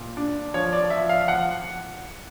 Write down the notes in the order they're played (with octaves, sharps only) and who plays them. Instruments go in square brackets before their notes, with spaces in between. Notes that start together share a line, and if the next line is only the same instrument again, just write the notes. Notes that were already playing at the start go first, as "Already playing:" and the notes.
Already playing: [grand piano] A#2
D4
F3 C#5
D5
F3 E5
F5
F3 F#5